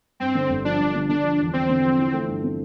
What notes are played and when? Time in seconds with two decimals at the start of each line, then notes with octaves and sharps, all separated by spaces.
0.20 G2 C4
0.35 D3
0.50 G1
0.65 F3 D4
0.79 G2
0.95 D3
1.09 D3 D4
1.24 F3
1.39 E2
1.53 E2 C4
1.69 D3
1.84 F3
1.99 E3
2.14 A3
2.28 G2
2.43 C4